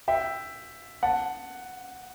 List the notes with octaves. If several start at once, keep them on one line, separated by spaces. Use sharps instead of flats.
E5 G5
F#5 A5